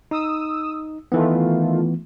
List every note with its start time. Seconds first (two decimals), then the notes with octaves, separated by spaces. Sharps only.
0.11 D#4 D#6 E6
1.12 D#3 E3 A3 B3 F4